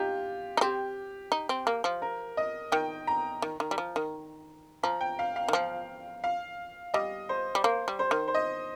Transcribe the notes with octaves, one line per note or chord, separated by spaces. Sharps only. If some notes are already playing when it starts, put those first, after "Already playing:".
Already playing: D#4 F4 G4
D#4
C4 G4
D#4
C4
A#3
F3
A#4
D#5
D#3 G5
A#5
D#3
D#3
G3
F3
D#3
F3 A#5
G5
F5
F5
D#3
F3
F5
G3 D#5
C5
G3
A#3 C5
G3
C5
D#3
C5
D#5